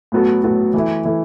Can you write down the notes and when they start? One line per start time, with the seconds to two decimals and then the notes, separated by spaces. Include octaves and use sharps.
0.12 A2 F#3 B3 F#4 A4
0.44 A2 F#3 B3 F#4 A4
0.74 E3 A3 E4
1.05 E3 A3 E4